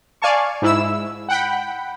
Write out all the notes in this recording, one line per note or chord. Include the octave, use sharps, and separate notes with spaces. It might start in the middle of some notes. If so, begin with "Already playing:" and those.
D5 F5 G#5 A5 C#6
G#2 E4 E6
F#5 G5 B5